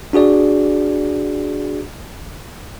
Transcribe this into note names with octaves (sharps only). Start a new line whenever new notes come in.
D4 F#4 G#4 D5